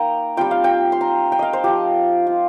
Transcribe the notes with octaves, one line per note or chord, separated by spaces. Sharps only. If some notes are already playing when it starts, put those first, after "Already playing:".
Already playing: A#3 D#4 G5 A#5
G3 C4 F4 G5
F5
G5
C6
A#5
G5
D#5 F5
C5
F3 C4 F4 G4
F4